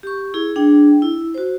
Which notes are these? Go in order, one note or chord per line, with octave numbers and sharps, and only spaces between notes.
G4 C#6
E4 G#4
D4 G#4 G5
E4
F#4 C5